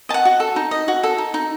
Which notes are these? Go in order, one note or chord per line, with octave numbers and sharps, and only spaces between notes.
D#5 A5
F#5
F#4
A4
D#4
D#5
F#4
A4
D#4
D#4